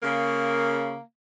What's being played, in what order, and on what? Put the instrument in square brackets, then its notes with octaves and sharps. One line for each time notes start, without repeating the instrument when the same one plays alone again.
[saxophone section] C#3 A#3